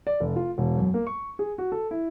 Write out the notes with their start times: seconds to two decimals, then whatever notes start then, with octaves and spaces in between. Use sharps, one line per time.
0.07 D5
0.20 F1
0.36 F4
0.58 E1
0.78 F#2
0.94 A#3
1.07 C#6
1.39 G#4
1.58 F#4
1.72 A4
1.91 E4